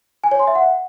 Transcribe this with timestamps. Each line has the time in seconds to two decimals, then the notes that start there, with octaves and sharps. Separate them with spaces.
0.24 G#5
0.31 C#5
0.39 C6
0.47 E5
0.55 F#5